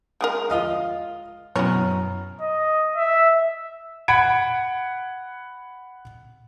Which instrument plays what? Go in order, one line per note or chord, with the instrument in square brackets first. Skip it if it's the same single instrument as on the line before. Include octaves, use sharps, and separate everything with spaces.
[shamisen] G#3 G#4 A#4
[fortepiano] F4 D#5 F5
[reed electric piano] F#2 A#5 F6 [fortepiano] B2 E3 [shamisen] F#4 C#5
[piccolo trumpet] D#5
E5
[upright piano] F#5 B5 G#6 D7